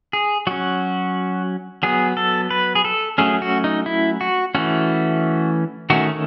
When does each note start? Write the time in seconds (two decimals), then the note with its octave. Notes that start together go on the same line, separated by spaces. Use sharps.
0.13 G#4
0.47 F#3 C#4 F#4
1.83 F#3 B3 G#4
2.17 A4
2.50 B4
2.75 G#4
2.85 A4
3.18 F#3 A3 C#4 G#4
3.42 F#4
3.64 D#4
3.86 E4
4.21 F#4
4.55 E3 A3 C#4 F#4
5.90 D#3 A3 C#4 F#4